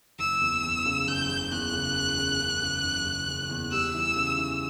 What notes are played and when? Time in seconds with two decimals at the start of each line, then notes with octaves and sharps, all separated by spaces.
0.19 F#1 E6
0.41 E2
0.63 E2
0.86 C#3
1.07 F#1 G6
1.29 F#1
1.51 E2 F#6
1.73 C#3
1.95 E2
2.17 C#3
2.40 C#3
2.62 C#3
2.84 F#1
3.06 F#1
3.28 F#1
3.49 E2
3.72 G3 E6
3.94 E3
4.16 C#3
4.38 E3